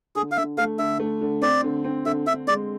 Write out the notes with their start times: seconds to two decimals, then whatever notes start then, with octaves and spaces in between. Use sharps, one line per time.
0.15 D3 G#4
0.32 F5
0.37 D3 E5
0.58 A3 F5
0.79 D3 E5
1.00 A3
1.21 D3
1.42 C4 D5
1.64 D3
1.84 C4
2.06 D3 E5
2.27 D3 E5
2.47 G#3 D5